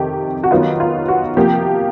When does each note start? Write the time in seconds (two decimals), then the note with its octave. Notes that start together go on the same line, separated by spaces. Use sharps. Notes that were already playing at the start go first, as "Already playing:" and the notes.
Already playing: F2 C3 D#3 G4
0.44 F#4
0.51 D#3 F#3 B3 D#4 F4
0.80 F4
1.08 F#4
1.37 C3 F3 A#3 G4